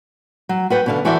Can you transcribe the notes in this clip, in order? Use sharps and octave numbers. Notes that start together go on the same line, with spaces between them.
F#3
F#4 B4 F#5 G5
B2 D3 F5
E3 F#4 A4 C5 D5 E5